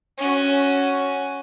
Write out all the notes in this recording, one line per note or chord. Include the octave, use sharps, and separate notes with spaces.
C#4 F#4